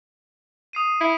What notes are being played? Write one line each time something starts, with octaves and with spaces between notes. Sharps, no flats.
D#6 C7 D#7
E4